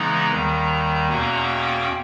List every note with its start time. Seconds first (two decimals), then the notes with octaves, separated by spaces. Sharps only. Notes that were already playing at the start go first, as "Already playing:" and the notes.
Already playing: C#3 E3 G#3 B3 D#4 A#5
0.31 D#2 D#3 G3
1.09 E2 B2 A#3 C#4 A#5
1.48 G5